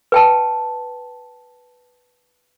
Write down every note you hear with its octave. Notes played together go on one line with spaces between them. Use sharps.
B4 G5 A5